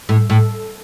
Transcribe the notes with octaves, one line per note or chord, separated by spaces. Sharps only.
A2
A2